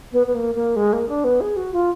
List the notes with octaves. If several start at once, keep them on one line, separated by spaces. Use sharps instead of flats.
B3
B3
A#3
A#3
G#3
A#3
D4
B3
G#4
F#4
F4